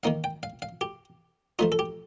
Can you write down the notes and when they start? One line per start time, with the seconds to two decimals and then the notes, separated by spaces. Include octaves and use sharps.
0.03 D#3 A#3 D#4 F5
0.24 G5
0.43 F5
0.62 F5
0.81 G4
1.59 F3 A3 D#4 F4
1.72 A4
1.79 G4